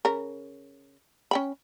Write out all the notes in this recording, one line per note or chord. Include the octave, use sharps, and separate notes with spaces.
C#3 A#4
C#4 G5 B5